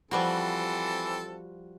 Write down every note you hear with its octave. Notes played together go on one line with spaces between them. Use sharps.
E3 F3 G3 C4 F#4 A4